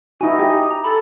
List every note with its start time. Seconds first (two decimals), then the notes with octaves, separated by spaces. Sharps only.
0.21 D#4 E4 F#4 G#5
0.39 E4 G4
0.71 A#5
0.84 A4 B5